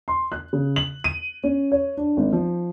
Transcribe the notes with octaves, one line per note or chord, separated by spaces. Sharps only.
C6
F#6
C#3
F#7
D#7
C#4
C#5
D4
G#1
F3